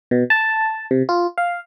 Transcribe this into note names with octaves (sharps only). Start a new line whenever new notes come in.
B2
A5
C3
F4
F5